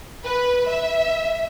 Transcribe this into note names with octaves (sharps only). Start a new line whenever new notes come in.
B4
E5